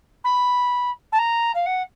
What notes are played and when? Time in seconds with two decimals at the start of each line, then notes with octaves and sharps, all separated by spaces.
0.24 B5
1.12 A5
1.18 A#5
1.54 F5
1.66 F#5